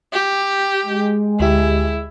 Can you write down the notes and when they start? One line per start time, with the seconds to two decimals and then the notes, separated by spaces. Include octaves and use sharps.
0.13 G4
0.86 G#3
1.40 D2 E4 G4